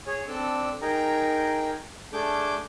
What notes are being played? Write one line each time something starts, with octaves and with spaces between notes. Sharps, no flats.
G#4 C#5
C4 D4 A4 D5 E6
D#4 G#4 A#4 G5 A#5
A3 D4 G#4 A4 D6 G6